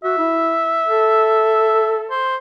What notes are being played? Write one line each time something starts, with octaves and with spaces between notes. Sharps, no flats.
F#4 E5
E4
A4
C5